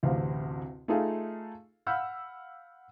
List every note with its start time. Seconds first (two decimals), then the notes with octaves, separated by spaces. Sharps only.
0.03 A1 D2 C3 F5
0.88 A3 D#4 F4 G#4 A4 F5
1.87 F5 F#5 B5 E6 F6 G6